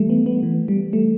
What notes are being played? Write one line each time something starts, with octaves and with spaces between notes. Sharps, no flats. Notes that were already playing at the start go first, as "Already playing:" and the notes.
Already playing: E3 G3 A3
B3
B3
E3
G3
A3